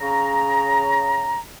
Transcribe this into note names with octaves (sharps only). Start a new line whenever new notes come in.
C#3 A#5